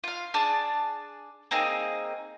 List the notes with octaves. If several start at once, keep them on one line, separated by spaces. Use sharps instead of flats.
F4 F5
D4 G#4 D5 A5
A#3 C4 D#4 G#4